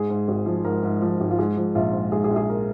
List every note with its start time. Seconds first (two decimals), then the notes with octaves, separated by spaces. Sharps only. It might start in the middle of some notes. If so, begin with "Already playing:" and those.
Already playing: G#2 G#4
0.10 G#2
0.28 G#1
0.46 F3
0.65 G#2 A#4
0.83 G#2
1.02 F3
1.21 G#1
1.30 F4
1.38 G#2 G#4
1.57 F3
1.75 A#1 F4
1.93 G#2
2.12 G#2 G#4
2.24 G#4
2.30 A#1
2.36 G#4
2.49 A#4